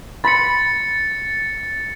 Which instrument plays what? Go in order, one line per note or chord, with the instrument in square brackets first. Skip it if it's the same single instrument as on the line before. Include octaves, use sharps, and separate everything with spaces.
[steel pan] B5 C6 [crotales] A6 C#7